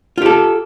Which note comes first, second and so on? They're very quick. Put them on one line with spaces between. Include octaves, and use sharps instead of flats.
F4 G4 A4